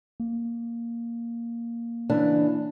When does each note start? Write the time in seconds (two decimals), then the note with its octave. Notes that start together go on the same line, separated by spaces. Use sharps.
0.20 A#3
2.09 C#3 E3 D4